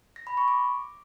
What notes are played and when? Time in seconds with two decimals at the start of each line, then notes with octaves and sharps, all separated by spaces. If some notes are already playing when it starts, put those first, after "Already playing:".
0.16 A#6
0.27 B5
0.37 C#6
0.48 D6